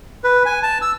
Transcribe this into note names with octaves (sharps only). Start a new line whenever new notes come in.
B4
G#5
A5
E6